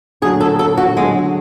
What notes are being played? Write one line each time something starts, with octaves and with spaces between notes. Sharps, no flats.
D3 F#3 A3 D4 G#4
A4
A4
F#4
D3 F#3 G#3 A3 D4